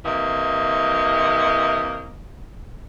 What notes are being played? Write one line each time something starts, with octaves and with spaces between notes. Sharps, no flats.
C3 E3 A#3 D#5